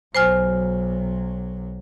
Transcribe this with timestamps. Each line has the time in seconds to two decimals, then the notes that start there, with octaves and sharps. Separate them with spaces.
0.15 B1 F#3 C5 G#5 F6